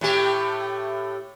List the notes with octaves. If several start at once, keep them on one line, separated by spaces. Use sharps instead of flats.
A2 A3 G4